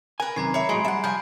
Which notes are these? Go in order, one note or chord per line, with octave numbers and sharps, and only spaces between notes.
A#4 B4 G#5
F#2 C3 D#3 A#5 G#6 C7
C#5 E5 B5
A2 F#3 G#3 D#4 G#5 C6 D7
G3 E5 F#5
F3 G#5 G6